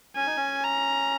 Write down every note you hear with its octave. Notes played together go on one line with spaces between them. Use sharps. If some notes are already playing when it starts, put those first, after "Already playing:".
C#4 G#5
D#4
C#4
A#5